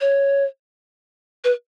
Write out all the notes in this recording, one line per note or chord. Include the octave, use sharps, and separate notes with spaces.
C#5
B4